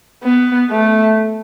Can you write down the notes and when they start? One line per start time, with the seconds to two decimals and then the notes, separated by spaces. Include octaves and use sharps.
0.24 B3
0.70 A3